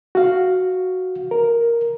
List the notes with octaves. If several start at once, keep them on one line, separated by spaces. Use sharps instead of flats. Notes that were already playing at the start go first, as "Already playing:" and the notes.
F#4 F5
A#4